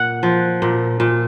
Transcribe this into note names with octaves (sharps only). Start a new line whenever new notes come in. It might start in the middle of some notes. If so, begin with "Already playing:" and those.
Already playing: A#2 F#5
F3
A#2
A#2